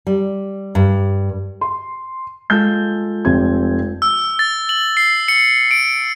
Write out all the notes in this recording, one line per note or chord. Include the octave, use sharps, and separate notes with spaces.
G3
G2
C6
G#3 F4 A4 G6
F1 C4 G#6
E6
A6
F#7
C7
C#7
D7